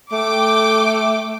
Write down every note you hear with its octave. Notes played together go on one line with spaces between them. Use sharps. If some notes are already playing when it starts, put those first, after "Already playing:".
A3 G5 D6